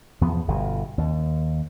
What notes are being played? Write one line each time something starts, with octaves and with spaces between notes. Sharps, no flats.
E2 F3 B3
G1 B2
D#2